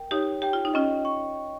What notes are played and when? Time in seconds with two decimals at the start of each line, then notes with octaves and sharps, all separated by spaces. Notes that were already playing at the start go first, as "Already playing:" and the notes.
Already playing: A#4 G5
0.11 D#4 G4 C#5
0.42 G4 G5
0.53 F4
0.65 D#4
0.74 C#4 F4 D#5
1.05 C#6